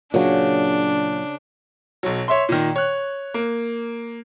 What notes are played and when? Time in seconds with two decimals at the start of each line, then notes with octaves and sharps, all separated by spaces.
0.14 A#2 C#3 F#3 D4
2.03 B1 F#3
2.28 C#5 E5 C6
2.49 A#2 D#3
2.76 C#5 F#6
3.34 A#3